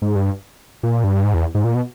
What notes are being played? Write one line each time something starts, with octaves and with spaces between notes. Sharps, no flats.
G#2
G2
A#2
G2
G#2
E2
G#2
A#2
B2